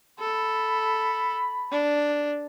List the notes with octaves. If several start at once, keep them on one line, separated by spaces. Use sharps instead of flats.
A4 B5
D4